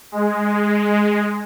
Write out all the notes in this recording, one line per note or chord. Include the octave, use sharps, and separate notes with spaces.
G#3